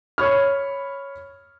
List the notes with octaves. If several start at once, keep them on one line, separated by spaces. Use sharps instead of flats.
C#5 B5 F6